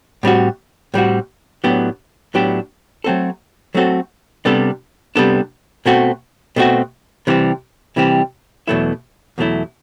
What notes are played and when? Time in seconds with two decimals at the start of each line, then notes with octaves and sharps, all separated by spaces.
0.23 A2 G3 C4 F#4
0.94 A2 G3 C4 F#4
1.64 A2 F#3 B3 D4 G4
2.34 A2 F#3 B3 D4 G4
3.04 F#3 A3 C4 F#4 A4
3.74 F#3 A3 C4 F#4 A4
4.45 C3 G3 B3 D4 A4
5.16 C3 G3 B3 D4 A4
5.86 B2 A3 C4 F#4
6.56 B2 A3 C4 F#4
7.27 C3 E3 G3 C4
7.96 C3 E3 G3 C4
8.68 E2 B2 F#3 A3 E4
9.38 E2 B2 F#3 A3 E4